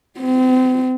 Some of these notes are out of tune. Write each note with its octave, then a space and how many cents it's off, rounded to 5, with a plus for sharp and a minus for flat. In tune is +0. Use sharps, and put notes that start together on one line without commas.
C4 -35